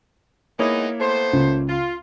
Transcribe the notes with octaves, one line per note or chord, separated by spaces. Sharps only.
G#3 A#3 B3 D#4 E4 C#5
A3 B3 C5
C#2
F4